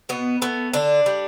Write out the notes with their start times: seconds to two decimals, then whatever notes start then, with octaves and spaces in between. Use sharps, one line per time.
0.09 B2 B3
0.42 A3 B3
0.74 D3 D4
1.06 G3